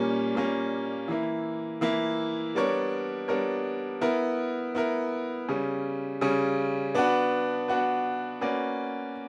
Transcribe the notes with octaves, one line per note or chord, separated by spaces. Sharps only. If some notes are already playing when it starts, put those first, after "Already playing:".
Already playing: A#2 G3 A#3 C#4
A#2 G3 A#3 C#4
E3 A#3 E4
E3 A#3 E4
G3 B3 D4 A#4 C#5
G3 B3 D4 A#4 C#5
B3 E4 A#4
B3 E4 A#4
C#3 G3 C#4
C#3 G3 C#4
B3 D4 F#4 B4
B3 D4 F#4 B4
A#3 C#4 F#4 B4 D5